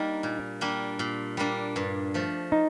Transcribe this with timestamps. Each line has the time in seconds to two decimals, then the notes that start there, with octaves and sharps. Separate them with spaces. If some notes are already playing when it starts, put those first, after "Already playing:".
Already playing: G3 A#3 D4 D#4
0.23 A#2
0.61 G3 A#3 D4
0.99 A#2
1.37 G3 A#3 D4
1.76 G2
2.14 F3 A3
2.52 D#4